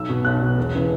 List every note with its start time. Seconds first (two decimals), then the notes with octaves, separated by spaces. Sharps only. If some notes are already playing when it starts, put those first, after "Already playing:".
Already playing: B1 E6
0.09 B2
0.25 B1 F#6
0.42 B2
0.57 E1
0.74 C#3 E3